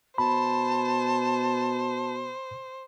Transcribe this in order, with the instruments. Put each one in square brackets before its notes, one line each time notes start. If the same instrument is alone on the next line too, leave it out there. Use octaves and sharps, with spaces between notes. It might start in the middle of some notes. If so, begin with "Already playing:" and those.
[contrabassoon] B2 [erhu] C5 [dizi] A5 [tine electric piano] B5